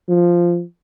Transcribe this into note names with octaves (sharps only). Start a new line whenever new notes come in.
F3